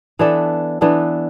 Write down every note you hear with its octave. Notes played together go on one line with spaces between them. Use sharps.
E3 B3 D4 A4
E3 B3 D4 A4